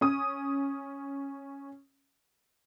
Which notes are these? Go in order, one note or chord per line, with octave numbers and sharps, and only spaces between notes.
C#4 D#6